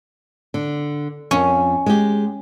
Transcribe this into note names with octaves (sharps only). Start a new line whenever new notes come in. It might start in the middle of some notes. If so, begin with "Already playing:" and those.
D3
F2 C#4
G#3 G4